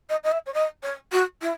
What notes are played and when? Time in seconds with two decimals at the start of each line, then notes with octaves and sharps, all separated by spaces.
0.09 D#5
0.23 D#5
0.32 E5
0.46 C#5
0.54 D#5
0.83 C#5
1.12 F#4
1.41 E4